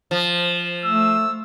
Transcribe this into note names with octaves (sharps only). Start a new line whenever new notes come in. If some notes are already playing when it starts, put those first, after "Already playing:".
F3
A3 E6